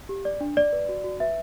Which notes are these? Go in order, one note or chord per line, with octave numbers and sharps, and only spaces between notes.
G4
D5
D4
D5
B4
F#4
F#4
B4 E5